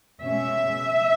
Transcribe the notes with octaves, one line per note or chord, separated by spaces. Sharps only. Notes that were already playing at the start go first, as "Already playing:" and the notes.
B2 G#3 C#4 E5